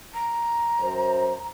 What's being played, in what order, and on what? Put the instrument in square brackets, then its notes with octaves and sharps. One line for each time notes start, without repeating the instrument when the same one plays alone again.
[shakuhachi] A#5
[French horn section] F#2 C5